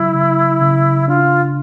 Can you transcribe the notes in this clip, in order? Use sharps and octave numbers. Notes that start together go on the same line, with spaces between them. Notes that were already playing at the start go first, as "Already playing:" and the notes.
Already playing: C#3 F#3 E4
C#3
C#3
D4 F4